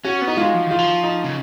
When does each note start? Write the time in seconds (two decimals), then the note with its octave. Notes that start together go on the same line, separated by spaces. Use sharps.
0.04 C#4 F#4
0.21 B3
0.28 D#4
0.37 G#3 F4
0.54 F3
0.66 D#3 F4
0.79 F3
1.03 D#4
1.24 C#3